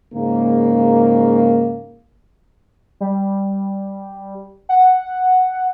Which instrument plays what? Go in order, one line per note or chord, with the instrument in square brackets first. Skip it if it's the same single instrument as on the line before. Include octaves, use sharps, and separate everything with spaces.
[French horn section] G#2 C#3 A#3
[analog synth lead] G3
F#5